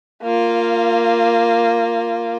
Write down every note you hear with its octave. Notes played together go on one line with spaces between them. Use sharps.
A#3 F4